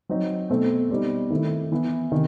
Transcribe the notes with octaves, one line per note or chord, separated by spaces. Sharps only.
F#3 C4 D#4
B2 A3 C4
B2 G3 C4 D#4
D#3 A3 C4 E4
E3 B3 E4
C3 D#3